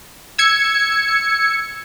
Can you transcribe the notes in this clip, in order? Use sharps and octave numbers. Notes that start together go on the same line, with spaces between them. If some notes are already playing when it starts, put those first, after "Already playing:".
E6 G#6 C#7